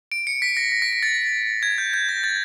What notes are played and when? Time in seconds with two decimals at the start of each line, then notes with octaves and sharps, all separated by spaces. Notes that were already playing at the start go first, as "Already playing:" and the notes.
0.12 D7
0.27 C#7
0.42 B6
0.57 A#6
0.72 A#6
0.82 B6
0.93 B6
1.03 A6
1.63 G#6
1.78 G6
1.94 G6
2.09 A#6
2.24 A6